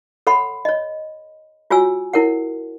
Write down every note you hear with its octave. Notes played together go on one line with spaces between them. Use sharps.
A4 C#5 F#5 B5 C6
C#5 D#5
F4 F#4 C#5 G#5 E6
E4 A#4 C#5 F#5